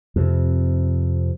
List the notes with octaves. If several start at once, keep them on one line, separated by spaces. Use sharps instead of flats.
F2 C3